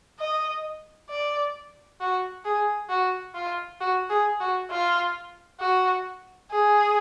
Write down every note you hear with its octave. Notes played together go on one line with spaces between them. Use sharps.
D#5
D5
F#4
G#4
F#4
F4
F#4
G#4
F#4
F4
F#4
G#4